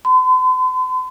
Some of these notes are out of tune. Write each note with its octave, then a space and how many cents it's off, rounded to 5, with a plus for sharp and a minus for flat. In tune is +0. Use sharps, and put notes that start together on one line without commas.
C6 -45